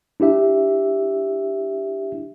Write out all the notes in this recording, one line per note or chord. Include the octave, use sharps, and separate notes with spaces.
D4 E4 G4 E5